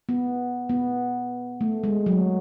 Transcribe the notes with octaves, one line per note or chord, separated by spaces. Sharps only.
B3
B3
A3
G#3
F#3